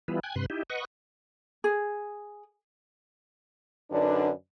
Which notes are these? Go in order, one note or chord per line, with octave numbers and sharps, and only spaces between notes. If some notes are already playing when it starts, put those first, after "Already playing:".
E3 G3 B3 E4 F4 B4
G5 G#5 F#6 G#6
G2 C3 B4 C6 F#6
D#4 E4 G4
B4 D#5 F#5 C#6
G#4
F#2 D3 D4 D#4 B4 D5